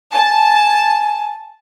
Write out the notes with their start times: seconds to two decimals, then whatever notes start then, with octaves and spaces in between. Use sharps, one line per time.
0.12 G#5 A5